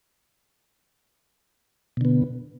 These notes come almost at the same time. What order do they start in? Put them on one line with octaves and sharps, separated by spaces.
B2 D3 B3